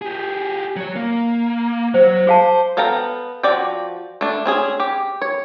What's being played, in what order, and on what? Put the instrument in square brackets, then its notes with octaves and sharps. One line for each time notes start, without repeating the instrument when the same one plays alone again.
[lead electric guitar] G4 G#4
F#3 C#5
A#3
[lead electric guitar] F#3 [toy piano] C5
[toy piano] G#4 F5 A5 [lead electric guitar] C5
[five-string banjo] B3 A4 F5 G5 A#5
F3 F#4 D5 G5
A3 D4
C4 C#4 G#4
G4
C#5